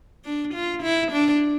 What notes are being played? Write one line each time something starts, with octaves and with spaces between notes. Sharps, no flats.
D4
F4
E4
D4